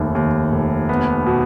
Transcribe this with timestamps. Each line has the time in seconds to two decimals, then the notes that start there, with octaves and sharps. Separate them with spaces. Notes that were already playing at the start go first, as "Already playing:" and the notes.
Already playing: F1 D#2
0.15 D#2
0.52 F1
0.89 B3
1.26 B2